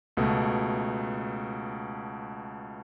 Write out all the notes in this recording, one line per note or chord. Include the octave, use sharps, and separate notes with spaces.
C#2 B2 A3